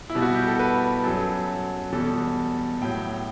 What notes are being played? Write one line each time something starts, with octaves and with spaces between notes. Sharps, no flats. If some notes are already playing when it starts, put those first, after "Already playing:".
E4
B2 G3
F#4
G4
A4
B4
F#2 F#3 A4
E2 B2 G3 A4
A2 F#3 G5